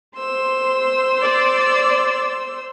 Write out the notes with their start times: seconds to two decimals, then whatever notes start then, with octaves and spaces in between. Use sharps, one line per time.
0.17 C5 C6 E6
1.22 D5